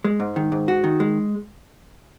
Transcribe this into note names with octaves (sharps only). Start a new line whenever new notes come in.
G#3
G#2
D#3
G#2
F#4
D#3
G#3